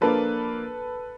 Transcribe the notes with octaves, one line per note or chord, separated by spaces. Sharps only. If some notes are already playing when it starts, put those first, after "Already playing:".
F3 A#3 D4 F4 A4 B4